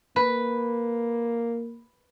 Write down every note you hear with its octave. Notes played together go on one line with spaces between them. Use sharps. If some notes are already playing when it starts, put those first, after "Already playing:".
A#3 B4